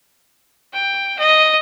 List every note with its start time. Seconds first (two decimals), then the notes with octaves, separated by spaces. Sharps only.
0.73 G5
1.19 D#5